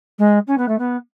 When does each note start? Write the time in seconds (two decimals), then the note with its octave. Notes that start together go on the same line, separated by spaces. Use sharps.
0.18 G#3
0.47 C#4
0.58 B3
0.68 A3
0.78 B3